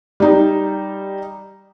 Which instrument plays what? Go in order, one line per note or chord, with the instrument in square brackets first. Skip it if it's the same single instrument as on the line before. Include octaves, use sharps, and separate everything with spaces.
[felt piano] G3 D#4